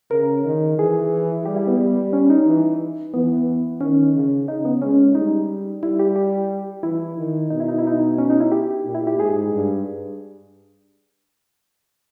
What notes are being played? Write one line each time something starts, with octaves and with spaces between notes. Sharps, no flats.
C#3 A#4
D#3
E3 G#4
G3 G4
E4
B3
G3
C#4
D#4
E3
E3 B3
D#3 C#4
C#3
C#3 D#4
B3
G#3 C#4
G3 D#4
G3 E4
G4
G4
E3 E4
D#3
B2 D#4
E4
D#4
E4
D#4
C#4
D#4
E4
G4
A#2
E4
G4
G#2 G#4
G2